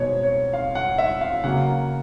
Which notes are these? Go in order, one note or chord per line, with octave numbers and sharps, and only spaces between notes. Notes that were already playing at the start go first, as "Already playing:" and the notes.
Already playing: B2 G#3 C4 D#4 C#5
C#5
F5
F#5
E5
F5
C#3 F#3 A#3 F#5